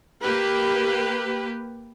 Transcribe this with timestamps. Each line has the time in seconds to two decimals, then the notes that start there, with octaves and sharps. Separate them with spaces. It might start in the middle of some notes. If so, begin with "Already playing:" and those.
0.22 A#3 G4 B4